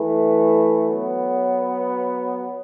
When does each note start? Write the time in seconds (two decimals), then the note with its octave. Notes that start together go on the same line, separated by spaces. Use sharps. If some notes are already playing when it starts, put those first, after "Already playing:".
Already playing: E3 A3
0.90 F#3 B3